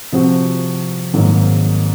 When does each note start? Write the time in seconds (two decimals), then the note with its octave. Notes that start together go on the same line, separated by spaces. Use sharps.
0.12 C3 F3 C4 F#4 C5
1.14 G#1 G#2 F#3 A#3